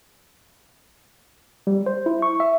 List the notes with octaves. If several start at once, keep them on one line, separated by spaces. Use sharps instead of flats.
G3
C5
E4
C#6
E5